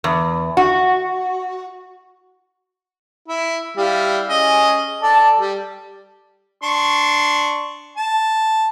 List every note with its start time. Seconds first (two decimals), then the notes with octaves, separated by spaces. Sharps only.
0.04 E2
0.57 F#4
3.28 E4
3.77 G3 E4 F5
4.29 C#4 G#4 D#5
5.02 A4 D5 A5
5.40 G3
6.63 D4 C6 C#6
7.97 A5